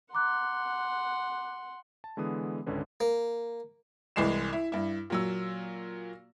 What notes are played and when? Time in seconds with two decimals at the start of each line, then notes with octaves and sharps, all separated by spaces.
0.13 F#5 A#5 C6 D6 F#6
2.04 A5
2.17 D3 E3 G#3 B3 D#6
2.66 G#1 C#2 D3 C#4 B4
3.00 A#3
4.16 C2 E3 G#3 C7 E7
4.53 E4
4.72 G2 E4
5.10 A#2 F#3 E6